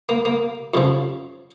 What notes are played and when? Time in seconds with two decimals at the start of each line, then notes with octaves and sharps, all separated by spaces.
0.09 A#3
0.25 A#3
0.74 F2 C#3 F3